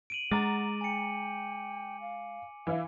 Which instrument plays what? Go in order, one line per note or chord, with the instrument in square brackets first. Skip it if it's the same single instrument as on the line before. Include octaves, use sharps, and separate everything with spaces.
[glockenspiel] D7 D#7 F#7
[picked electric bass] G#3 [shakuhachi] F#5 [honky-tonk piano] A#5 A6 [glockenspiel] D6
[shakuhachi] G5 [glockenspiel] G#5 C#7
[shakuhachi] F5
[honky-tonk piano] E3 E4 [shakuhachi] F5